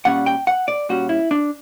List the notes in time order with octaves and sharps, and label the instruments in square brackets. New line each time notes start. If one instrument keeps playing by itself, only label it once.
[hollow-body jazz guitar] A#2 G3 C#4 F#5
G5
F#5
D5
A#2 G3 C#4 F#4
E4
D4